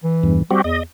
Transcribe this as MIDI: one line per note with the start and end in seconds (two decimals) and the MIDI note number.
0.04 0.39 52
0.23 0.42 40
0.23 0.42 43
0.51 0.64 55
0.51 0.62 60
0.51 0.62 66
0.51 0.62 67
0.64 0.81 40
0.64 0.83 75